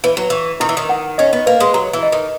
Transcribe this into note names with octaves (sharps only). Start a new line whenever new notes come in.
E3 B4
F#3
E3 C#6
D#3 E4
E3
D#3
F#5
C#4 D#5
B3
A#3 B4
G#3
F#3 A#5
E3
D#5
D#3